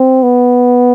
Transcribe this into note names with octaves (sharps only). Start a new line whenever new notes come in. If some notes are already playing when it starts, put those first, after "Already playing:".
Already playing: C4
B3